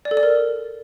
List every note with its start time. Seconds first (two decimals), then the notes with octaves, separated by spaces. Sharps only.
0.05 D5
0.11 A4
0.17 D5
0.23 A#4